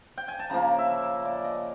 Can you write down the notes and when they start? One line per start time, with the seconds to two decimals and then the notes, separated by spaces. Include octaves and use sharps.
0.18 G5
0.28 G#5
0.39 A5
0.50 C#3 F3 A#3 A#5
0.79 E5
1.25 D5
1.44 D#5